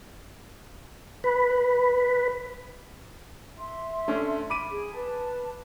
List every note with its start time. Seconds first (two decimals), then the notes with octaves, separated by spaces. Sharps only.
1.24 B4
3.57 E5 C6
4.08 A3 C#4 D4
4.50 B5 D6 D#7
4.70 G#4
4.94 B4 A5